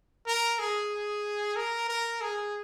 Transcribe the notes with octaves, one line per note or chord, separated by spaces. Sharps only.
A#4
G#4
A#4
A#4
G#4